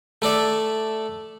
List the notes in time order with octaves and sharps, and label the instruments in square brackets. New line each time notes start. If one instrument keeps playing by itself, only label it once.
[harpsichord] A3 A4 D5 E5